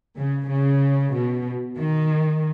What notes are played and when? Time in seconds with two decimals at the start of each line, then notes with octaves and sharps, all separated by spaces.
0.18 C#3
0.49 C#3
1.14 B2
1.78 D#3